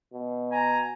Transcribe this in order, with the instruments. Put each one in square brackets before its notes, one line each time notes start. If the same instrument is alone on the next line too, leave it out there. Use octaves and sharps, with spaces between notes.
[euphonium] B2
[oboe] G#5 [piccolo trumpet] A#5